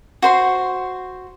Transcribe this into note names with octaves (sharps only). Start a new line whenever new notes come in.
F#4 C5 C6